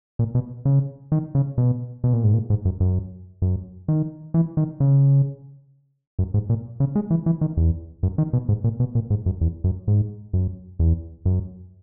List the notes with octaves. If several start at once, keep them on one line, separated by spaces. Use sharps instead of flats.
A#2
B2
C#3
D#3
C#3
B2
B2
A#2
G#2
A#2
G#2
F#2
F#2
F#2
D#3
E3
D#3
C#3
F#2
G#2
A#2
C#3
G#3
E3
E3
D#3
E2
F#2
D#3
B2
G#2
A#2
B2
A#2
G#2
F#2
E2
F#2
G#2
F#2
E2
F#2